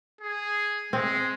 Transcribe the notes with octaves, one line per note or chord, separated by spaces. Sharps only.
G#4
G#3 C4